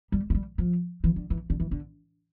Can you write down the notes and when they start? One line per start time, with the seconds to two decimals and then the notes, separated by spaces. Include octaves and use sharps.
0.12 G3
0.30 A3
0.35 G3
0.58 F3
1.04 E3
1.16 D3
1.30 E3
1.50 D3
1.60 E3
1.71 D3